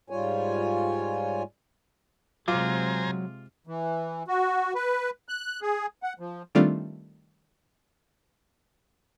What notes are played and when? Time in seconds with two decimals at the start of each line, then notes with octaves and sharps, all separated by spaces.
0.10 G#2 G3 F4 C#5 G#5
2.48 C3 F#3 G#3 F4 C5 G#5 A#5 D6
3.67 E3
4.28 F#4
4.75 B4
5.29 F#6
5.62 G#4
6.03 F#5
6.19 F3
6.55 D#3 G3 A3 C4 D4 F4